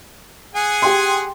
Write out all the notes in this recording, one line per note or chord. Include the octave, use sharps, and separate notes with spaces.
G#4 F#5 G#5
G4 G5 C6